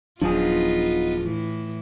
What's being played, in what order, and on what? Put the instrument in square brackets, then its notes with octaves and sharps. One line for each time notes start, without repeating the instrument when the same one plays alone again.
[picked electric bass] D#1 F#3 [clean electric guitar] F3 G#4 [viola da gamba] B3 D#4 F4 [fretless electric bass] D4
[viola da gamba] A2 E3